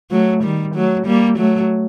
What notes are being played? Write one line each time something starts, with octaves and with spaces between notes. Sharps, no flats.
F#3 A3
D#3 G3
F#3 A3
G3 A#3
F#3 A3